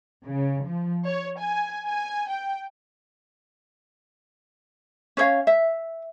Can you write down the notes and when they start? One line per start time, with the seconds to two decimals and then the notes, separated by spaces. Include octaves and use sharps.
0.23 C#3
0.65 F3
1.05 C#5
1.39 G#5
1.87 G#5
2.29 G5
5.17 C#4 C5 C#5 F5
5.47 E5